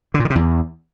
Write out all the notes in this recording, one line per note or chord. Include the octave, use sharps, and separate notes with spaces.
D3
A#2
D#3
C3
E2